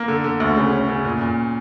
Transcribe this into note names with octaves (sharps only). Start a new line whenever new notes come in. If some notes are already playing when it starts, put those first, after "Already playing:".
Already playing: A#3
D3
D3
D2
C#3
C#4
C#3
A#2
A#2